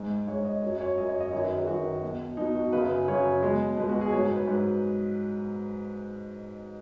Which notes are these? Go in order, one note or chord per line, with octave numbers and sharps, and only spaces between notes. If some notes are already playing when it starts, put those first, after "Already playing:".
Already playing: G#2 G#3
G#2 G#3 C#5
D#5
F#2 F#3 C#5
C#5
F#2 F#3 D#5
C#5
D#5
F#2 D#3 F#3 C#5
B4
G#4
F#2 D#3 F#3 F#4
B2 F#3
B2 F#3 D#4
F#4
F#2 C#3 F#3 B4
F#2 C#3 F#3 C#5
B2 G#3
B2 G#3 B4
F#4
G#4
G#2 F#3 C#5
B4
G#2 F#3